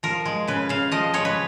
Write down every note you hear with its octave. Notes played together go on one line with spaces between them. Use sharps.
F3 A#4
G#3
C#3 B4
C#3 F5
F3 D#5
G#3 C#5
B4